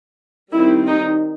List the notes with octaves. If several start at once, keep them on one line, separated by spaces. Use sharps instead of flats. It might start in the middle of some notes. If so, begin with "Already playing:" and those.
D#3 G3 C4 E4
D#4